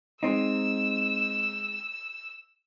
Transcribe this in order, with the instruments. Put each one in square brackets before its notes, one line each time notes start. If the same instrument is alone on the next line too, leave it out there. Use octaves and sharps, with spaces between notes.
[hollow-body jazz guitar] G#3 C4 D#4 [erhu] E6